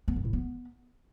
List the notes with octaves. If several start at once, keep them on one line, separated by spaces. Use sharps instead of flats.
B3
F2
A2
B3